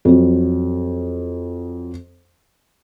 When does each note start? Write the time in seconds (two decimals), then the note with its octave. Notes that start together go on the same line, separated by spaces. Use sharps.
0.05 F2 F#3